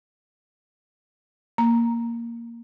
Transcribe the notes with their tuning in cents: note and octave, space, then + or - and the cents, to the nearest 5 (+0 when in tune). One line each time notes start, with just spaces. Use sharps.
A#3 +0 A#5 +0